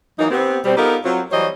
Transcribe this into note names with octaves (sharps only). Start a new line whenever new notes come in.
E3 F#3 A#3 D#4
B3 C4 G4
B2 G3 C4
B3 D#4 F4 G4 A4 A#4
F#3 C4 F4
E3 F#3 G3 C5 C#5 D#5